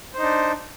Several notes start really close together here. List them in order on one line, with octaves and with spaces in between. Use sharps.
C5 D#4 D4